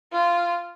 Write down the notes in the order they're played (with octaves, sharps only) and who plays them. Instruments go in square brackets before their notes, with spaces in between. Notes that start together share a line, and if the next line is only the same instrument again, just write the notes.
[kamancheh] F4